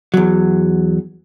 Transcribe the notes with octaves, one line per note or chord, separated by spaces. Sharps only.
E2 F#3